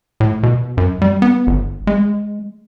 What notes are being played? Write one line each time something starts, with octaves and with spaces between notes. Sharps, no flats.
A2
B2
F#2
G3
B3
G1
G#3